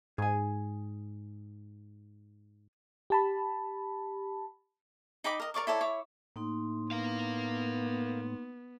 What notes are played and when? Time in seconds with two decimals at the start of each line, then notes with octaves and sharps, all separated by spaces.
0.18 G#2 G#4 G#5
3.10 G4 A5 B5
5.24 D#4 G5 B5 D6
5.40 A#4 D#5
5.54 A#4 D5 C#6 D6
5.67 E4 A4 C#5 D5
5.81 E4 C#5 D6
6.36 A2 A#3 D#4 C6
6.91 B3 A#4 F5